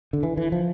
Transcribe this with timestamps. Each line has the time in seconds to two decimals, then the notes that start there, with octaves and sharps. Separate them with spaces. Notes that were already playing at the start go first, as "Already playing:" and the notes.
0.13 D3
0.23 E3
0.37 E3
0.52 F3